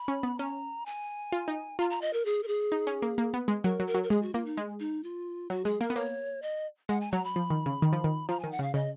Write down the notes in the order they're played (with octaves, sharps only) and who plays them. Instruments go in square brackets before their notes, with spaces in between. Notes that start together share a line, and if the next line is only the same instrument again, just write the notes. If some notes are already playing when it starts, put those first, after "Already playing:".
Already playing: [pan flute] B5
[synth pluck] C#4
B3
[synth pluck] C#4 [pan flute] A#5
[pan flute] G#5
[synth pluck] F4
D#4
[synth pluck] F4 [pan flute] A#5
[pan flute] A#5
D#5
A#4
G#4
A#4
G#4
[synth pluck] D#4
C#4
A#3
A#3
B3
G#3
[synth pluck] F#3 [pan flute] A#4
[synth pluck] F#3
[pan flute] A#4
[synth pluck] F#3
[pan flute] A#4
[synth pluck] G#3 [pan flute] G#4
[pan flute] F#4
[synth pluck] A#3 [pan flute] F4
[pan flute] D#4
[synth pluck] G#3
[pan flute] D#4
F4
[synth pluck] F#3 [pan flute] F#4
[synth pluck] G#3 [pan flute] G#4
[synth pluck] A#3 [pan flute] A#4
[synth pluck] B3
[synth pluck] A#3 [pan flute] C#5
[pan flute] D#5
[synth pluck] G#3 [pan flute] F#5
[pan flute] G#5
[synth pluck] F#3 [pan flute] A#5
[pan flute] B5
[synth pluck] F3
D#3
C#3
D#3
F3
D#3
[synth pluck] F3 [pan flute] A#5
[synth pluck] D#3 [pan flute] G#5
[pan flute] F#5
[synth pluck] C#3
[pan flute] F5
[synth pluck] C#3 [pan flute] D#5